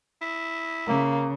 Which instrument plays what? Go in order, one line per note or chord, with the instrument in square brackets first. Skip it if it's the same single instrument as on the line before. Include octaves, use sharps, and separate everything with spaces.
[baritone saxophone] E4
[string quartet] C#3 [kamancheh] A#3